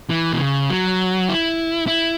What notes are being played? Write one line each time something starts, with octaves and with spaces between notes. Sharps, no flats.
E3
B2
C#3
F#3
E4
E4